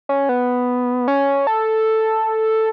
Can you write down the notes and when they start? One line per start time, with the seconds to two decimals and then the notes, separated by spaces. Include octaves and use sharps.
0.09 C#4
0.29 B3
1.08 C#4
1.47 A4